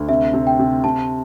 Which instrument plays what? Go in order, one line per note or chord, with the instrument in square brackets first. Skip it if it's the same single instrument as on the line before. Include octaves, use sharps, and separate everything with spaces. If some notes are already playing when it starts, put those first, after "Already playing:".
Already playing: [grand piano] D2
[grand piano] C3 [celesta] E5
[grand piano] C3
[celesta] G5
[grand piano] C3
[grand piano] C3 [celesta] A5